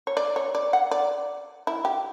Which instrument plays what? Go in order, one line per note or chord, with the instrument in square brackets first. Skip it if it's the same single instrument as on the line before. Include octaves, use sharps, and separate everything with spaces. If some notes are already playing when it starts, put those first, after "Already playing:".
[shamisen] C#5
D5
C#5
D5
F#5
D5
E4
G4